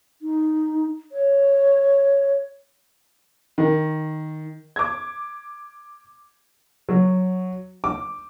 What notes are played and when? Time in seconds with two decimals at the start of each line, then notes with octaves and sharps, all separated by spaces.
0.22 D#4
1.12 C#5
3.58 D#3
4.76 D6 G#6
6.89 F#3
7.84 D6